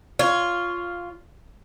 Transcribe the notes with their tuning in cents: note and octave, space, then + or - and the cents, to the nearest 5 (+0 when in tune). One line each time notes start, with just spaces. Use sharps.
F4 +0 C#5 +15 F5 +0